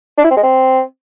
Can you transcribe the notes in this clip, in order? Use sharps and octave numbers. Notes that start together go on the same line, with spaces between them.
D4
E4
C4
G#3
C4